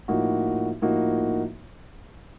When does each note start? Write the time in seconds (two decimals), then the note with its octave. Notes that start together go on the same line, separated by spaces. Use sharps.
0.08 A2 F3 A#3 D#4 F#4
0.82 A2 F3 A#3 D#4 F#4